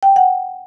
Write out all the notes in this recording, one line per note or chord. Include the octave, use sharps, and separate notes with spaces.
G5
F#5